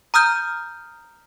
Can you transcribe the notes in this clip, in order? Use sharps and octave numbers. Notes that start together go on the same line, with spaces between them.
A#5 D#6 F6 G6